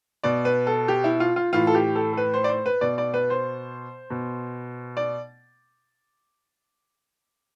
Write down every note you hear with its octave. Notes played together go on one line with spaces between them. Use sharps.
B2 D5
B4
A4
G4
E4
F4
F4
A2 E3 F4
A4
G4
A4
A4
B4
C5
D5
C5
B4
B2 D5
D5
B4
C5
B2
D5